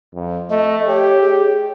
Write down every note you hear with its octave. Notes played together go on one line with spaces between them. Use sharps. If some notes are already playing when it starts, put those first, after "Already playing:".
F2
A3 D#5
G4 C#5
G#4